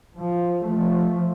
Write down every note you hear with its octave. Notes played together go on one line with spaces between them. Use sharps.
F3
F3 A3